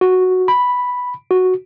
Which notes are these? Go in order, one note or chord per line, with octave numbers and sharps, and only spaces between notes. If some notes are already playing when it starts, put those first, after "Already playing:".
F#4
B5
F#4